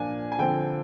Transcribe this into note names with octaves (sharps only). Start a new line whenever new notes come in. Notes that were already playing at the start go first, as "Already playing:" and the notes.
Already playing: A#2 F3 A#3 D4 G#5
G#5
D3 F3 C4 G5